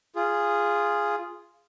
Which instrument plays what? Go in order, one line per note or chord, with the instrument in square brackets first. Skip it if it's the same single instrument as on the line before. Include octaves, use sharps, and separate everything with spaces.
[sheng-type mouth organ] F4 G#4